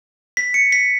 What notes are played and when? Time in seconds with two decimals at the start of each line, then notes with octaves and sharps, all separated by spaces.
0.37 B6
0.54 C#7
0.72 B6